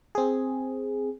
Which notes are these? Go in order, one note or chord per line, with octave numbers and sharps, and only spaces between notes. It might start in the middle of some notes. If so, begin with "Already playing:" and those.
C4 G#4